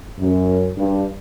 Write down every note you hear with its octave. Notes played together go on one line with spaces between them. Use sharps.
F#2
G2